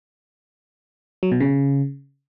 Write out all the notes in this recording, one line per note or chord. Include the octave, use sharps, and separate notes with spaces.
F#3
B2
C#3